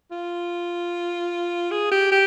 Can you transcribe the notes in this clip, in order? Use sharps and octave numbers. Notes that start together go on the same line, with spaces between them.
F4
G#4
G4
G4